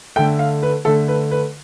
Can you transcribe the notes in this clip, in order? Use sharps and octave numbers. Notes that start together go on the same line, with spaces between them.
D3 A3 G5
F5
B4
D3 A3 A4
B4
B4